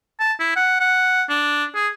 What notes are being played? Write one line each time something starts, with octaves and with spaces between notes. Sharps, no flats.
A5
E4
F#5
F#5
D4
G#4